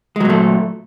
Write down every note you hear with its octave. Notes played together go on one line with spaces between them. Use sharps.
A#2 F#3 G#3 A3